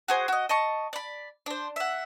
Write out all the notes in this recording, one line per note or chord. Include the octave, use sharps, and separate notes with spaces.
F#4 G#4 C5
F#4 D#5
D#5 A5 C#6
D5 B5
D4 C5
E5 F#5